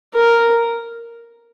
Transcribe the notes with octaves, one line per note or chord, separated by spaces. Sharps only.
A#4